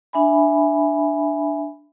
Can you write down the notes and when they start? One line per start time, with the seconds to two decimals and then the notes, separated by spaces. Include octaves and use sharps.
0.13 D4 E5 G#5 B5